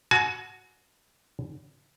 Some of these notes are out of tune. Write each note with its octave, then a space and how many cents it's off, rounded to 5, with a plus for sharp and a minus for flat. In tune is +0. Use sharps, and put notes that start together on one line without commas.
F#4 +0 G#5 +40